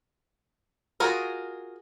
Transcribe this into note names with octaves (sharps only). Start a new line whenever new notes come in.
F4 F#4 G#4 A#4